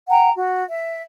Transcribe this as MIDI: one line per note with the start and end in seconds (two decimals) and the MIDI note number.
0.09 0.29 78
0.09 0.29 79
0.09 0.29 82
0.37 0.64 66
0.69 1.01 76